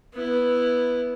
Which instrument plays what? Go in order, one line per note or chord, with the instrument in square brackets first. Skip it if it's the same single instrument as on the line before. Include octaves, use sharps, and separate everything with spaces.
[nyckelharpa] B3 E4